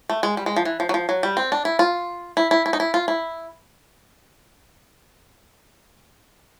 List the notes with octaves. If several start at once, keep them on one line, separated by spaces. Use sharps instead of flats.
A3
G#3
G3
G#3
F3
E3
F3
F#3
F3
F#3
G3
C4
D4
E4
F4
E4
E4
E4
D#4
E4
F4
E4